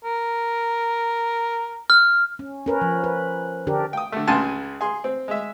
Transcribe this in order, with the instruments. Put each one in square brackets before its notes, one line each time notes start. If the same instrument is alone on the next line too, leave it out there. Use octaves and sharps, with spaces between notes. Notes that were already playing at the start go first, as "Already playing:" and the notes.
[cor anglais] A#4
[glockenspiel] F6
[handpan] C#4
C#4 A#4 B4
F3
B4
D3 D4 G4 A#4
[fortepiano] G5 D#6
D3 A3
C#2 C#3 G#5 A5 C6
G#4 C6
C4
G#3 E5